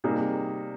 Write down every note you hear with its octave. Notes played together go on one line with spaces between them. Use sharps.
C3 G3 A#3 D#4 G#4